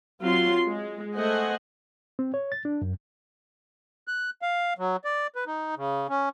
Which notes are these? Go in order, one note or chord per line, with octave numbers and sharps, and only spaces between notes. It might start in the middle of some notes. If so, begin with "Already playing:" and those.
F#3 C4 F4 C6
G#3
A3 C5 D#5 F#5 G#5
C4
C#5
A6
D4
F#2
F#6
F5
F#3
D5
B4
D#4
C#3
C#4